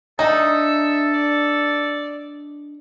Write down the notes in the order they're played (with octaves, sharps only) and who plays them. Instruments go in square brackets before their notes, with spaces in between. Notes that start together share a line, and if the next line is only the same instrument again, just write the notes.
[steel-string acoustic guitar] D4 D#5 [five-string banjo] D#4 [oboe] A4 [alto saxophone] E5
[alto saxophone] D5